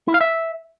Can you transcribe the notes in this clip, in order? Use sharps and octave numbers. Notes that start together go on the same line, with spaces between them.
E4
F5
E5